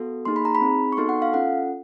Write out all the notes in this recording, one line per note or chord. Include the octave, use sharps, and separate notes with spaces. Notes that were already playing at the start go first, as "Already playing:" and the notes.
Already playing: B3 F#4 A4
A#3 D#4 G#4 C6
B5
A#5
B5
C4 D#4 G#4
C#6
B3 D#4 F#4 A4 C6
F#5
F5
C#4 F4 A4 F#5